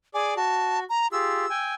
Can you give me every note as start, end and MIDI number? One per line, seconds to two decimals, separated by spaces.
0.14 0.35 68
0.14 0.35 74
0.14 0.35 80
0.14 0.35 86
0.37 0.84 66
0.37 0.80 81
0.89 1.07 82
1.12 1.46 65
1.12 1.46 67
1.12 1.46 68
1.12 1.74 88
1.50 1.74 79
1.50 1.74 80